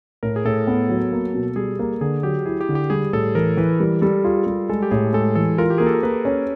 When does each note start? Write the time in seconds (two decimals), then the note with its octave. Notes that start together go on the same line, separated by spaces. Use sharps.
0.23 A2 A#4
0.36 G#4
0.45 A2 A4
0.67 B3
0.89 F#3
1.12 A#3
1.34 B2
1.56 G3 G#4
1.79 A#3 G#4
2.01 D3 G#4
2.23 F#3 G4
2.46 E4 G#4
2.61 G4
2.69 D3
2.75 G4
2.90 G3 G#4
3.13 A2 A4
3.35 E3 A#4
3.57 E3 B4
3.80 G3 A#4
4.02 G3 A4
4.24 F4 G#4
4.47 G3
4.69 G#3 A4
4.82 G4
4.91 A2 G#4
5.13 G#3 A4
5.35 E3 A4
5.58 F4 A#4
5.70 G4
5.78 A#3 G#4
5.87 A4
5.94 A#4
6.03 A#3 B4
6.25 C#4